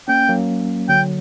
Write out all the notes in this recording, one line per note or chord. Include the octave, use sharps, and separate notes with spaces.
A#3 C#4 G5
F#3 A#3
D3 F#3 G5